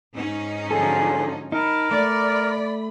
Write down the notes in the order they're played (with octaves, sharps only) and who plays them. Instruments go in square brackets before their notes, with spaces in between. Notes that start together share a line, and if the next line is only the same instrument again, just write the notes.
[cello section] G#2 C#4 D#4
[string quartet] D3 F3 F#3 [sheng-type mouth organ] G#4 [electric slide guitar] A4
[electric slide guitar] D#4 [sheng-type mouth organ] A#4 [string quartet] A5 B5
[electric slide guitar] A3 [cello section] D5 [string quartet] B5